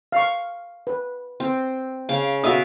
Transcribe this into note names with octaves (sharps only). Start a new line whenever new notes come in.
F5 C#6
B4
C4
C#3 F5
B2 F#4 E5 F5 D#6